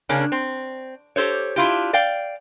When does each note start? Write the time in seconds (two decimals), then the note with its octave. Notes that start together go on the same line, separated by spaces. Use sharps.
0.09 C#3 A#3 C#4 D4
0.32 C4
1.16 G4 A4 C5 C#5
1.56 D4 E4 F4 G4
1.93 D5 F5 G5